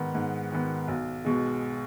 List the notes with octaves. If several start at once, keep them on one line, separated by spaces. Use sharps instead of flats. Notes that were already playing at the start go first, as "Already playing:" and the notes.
Already playing: G#2 D#3 B3
G#2
D#3 B3
B1
B2 G#3